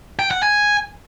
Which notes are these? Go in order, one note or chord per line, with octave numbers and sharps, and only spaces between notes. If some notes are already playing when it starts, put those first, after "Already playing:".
G5
F#5
G#5